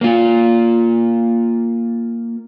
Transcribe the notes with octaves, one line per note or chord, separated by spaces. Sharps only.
A#3 F4